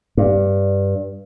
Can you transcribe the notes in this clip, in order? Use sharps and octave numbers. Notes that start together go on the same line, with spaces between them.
G2